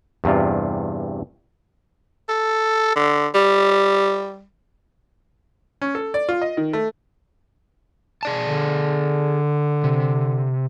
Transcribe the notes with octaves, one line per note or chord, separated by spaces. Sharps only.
E2 G2 C3 F4
A4
D3
G3
C#4
A4
D5
F4
D#5
D#3
A3
G#4 D5 A5
D3
C3